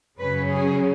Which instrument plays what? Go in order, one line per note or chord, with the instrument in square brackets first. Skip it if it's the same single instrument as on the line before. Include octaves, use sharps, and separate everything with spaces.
[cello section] F#2 C#3 F#3 C#4 B4
G#4